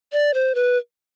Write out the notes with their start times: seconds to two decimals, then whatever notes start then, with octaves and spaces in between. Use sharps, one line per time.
0.13 D5
0.34 C5
0.55 B4